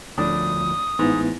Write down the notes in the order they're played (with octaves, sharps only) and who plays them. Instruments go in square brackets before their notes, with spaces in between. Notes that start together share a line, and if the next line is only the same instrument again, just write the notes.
[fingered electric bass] D2 F3 [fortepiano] A2 D4 [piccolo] D#6
[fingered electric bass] A1 [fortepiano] G#2 [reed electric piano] B3 E4